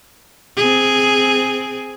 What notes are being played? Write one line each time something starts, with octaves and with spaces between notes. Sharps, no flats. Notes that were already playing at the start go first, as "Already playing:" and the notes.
C4 G#4